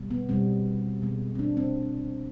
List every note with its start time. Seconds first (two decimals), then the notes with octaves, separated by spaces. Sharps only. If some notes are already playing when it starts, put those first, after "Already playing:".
Already playing: B2 G3
0.11 B3
0.29 B2 G3 C4
1.02 B2 G#3
1.35 C4
1.39 D4
1.57 C4